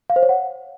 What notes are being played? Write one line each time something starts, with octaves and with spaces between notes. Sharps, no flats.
F5
C5
C#5
F#5